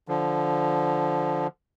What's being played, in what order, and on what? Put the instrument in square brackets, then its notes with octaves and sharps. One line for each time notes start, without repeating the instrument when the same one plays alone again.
[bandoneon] D3 F3